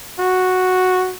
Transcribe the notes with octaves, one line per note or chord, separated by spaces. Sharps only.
F#4